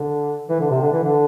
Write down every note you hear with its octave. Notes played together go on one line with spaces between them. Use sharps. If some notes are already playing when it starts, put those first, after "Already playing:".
Already playing: D3
E3
D3
C3
D3
E3
D3